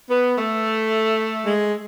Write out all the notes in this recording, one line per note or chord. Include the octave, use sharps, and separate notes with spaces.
B3
A3
G#3